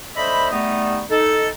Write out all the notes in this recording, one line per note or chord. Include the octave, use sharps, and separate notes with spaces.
A3 D4 C5 D#5 E5 B5
G3 A3 B3 D#4
D#4 A4